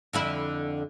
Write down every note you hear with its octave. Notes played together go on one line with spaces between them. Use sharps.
F2 D3 E4